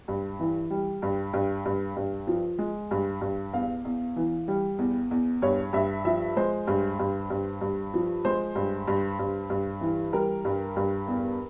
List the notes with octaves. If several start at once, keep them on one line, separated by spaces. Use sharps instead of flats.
G2
E3
G3
G2
G2
G2
G2
F3
G#3
G2
G2
E2 F5
E2
E3
G3
E2
E2
G2 C#5
G2 E5
F3 E5
G#3 C5
G2
G2
G2
G2
F3
G#3 C5
G2
G2
G2
G2
E3
G3 A#4
G2
G2
E2